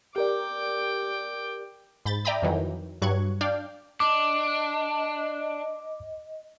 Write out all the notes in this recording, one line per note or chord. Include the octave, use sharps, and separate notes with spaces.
G4 A#4 D5 G5 D6
G#2 B5 G6 A6
D5 E5 G5 A#5 B5 D#6
F2 D#3 E3 F#3
G2 F#3 C#6 F#6 G#6
D4 D5 F5 G5
D4 D#5 D6